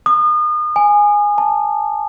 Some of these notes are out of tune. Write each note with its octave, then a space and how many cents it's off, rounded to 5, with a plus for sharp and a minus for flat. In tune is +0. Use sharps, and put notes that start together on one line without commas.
D#6 -35
G#5 -5
A5 +0